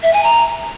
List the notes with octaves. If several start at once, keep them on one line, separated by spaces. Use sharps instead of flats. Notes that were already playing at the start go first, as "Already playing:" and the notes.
E5
G#5
A#5